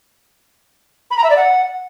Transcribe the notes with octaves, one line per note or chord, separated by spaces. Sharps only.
B5
A#5
E5
D5
F#5